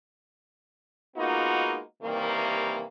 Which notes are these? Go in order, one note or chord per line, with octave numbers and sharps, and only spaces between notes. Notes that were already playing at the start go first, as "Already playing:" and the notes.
G#3 A#3 B3 D#4 F4 F#4
C3 D#3 E3 G3 A#3